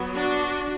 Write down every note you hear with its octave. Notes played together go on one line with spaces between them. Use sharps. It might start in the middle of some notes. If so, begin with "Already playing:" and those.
Already playing: F#3 B3
D4 F#4